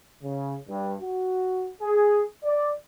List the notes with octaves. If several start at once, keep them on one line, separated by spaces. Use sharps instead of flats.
C#3
G2
F#4
G#4
D5